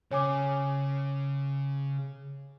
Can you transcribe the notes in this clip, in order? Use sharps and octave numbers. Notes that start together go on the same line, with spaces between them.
C#3 C#5 G#5 D6